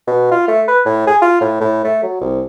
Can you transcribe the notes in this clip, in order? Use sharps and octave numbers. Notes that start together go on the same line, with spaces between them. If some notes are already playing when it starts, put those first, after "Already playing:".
B2
F4
A3
B4
A2
G#4
F4
A2
A2
A3
F#3
C2